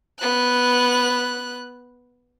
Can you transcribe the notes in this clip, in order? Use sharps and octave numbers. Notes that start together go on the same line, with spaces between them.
B3 F#6